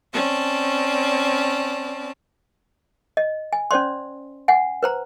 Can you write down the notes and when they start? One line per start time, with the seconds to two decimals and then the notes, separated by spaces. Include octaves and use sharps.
0.14 C4 C#4 D5 A5
3.17 D#5
3.53 G#5
3.71 C#4 C5 D5 C6
4.48 F#5 G#5
4.83 B4 C5 A#5